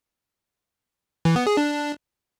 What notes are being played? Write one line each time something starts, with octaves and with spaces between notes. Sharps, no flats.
E3
B3
G#4
D4